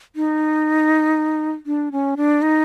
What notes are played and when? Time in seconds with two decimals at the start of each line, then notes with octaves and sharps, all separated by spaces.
0.16 D#4
1.66 D4
1.92 C#4
2.17 D4
2.42 D#4